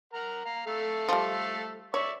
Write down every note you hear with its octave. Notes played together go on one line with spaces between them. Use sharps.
A#4 F#5 A#5
F5 A#5
A3 A4 F5
F3 G3
C#5 D5 E5 C#6